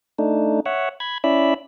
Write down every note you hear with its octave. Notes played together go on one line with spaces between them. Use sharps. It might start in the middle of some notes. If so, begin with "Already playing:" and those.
A3 D4 D#4
C#5 E5 F#5
B5 G#6
C#4 E4 D5 E5 B5